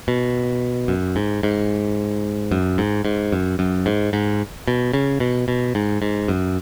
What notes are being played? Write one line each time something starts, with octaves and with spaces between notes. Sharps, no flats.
B2
F#2
G#2
G#2
F#2
G#2
G#2
F#2
F#2
G#2
G#2
B2
C#3
B2
B2
G#2
G#2
F#2